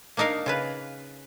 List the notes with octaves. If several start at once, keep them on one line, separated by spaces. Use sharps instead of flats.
A#3 D4 D#4 A#4 F5
C#3 F4 B4